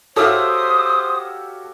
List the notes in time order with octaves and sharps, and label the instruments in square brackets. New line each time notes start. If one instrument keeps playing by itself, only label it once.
[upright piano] F#4 A4 C#5 [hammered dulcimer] G4 E5 F5 [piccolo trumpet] C5 [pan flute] D#6